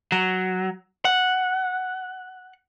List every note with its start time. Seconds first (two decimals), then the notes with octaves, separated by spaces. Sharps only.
0.12 F#3
1.05 F#5